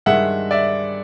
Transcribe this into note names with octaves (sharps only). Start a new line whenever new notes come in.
G2 D#3 G#3 E5 F#5
D5 E5